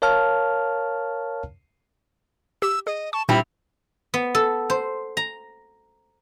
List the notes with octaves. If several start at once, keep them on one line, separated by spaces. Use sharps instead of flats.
A#4 C#5 F5 A5 F6
G4 E6
G#4 D#5
A5 C#6
A#2 G3 C4 D4 E4 G5 B5
B3
A4
C5
A#5